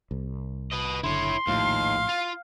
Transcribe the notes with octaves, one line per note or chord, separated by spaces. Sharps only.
C2
B4 D#5
F#1 D3 E4 C#5 C6
A#1 D#2 A2 F3 F5
F4